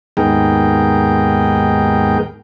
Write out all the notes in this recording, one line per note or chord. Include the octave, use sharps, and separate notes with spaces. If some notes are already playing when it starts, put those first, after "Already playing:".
D#2 G#2 B3 G#4 A#4 G5